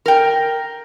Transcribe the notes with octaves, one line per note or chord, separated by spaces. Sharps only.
A#4 G5